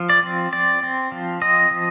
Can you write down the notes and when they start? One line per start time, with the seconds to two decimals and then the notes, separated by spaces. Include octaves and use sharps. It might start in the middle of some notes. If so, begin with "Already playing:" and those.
Already playing: F3
0.09 D5
0.23 C4
0.53 C4 D5
0.83 C4
1.12 F3
1.42 C4 D#5
1.71 F3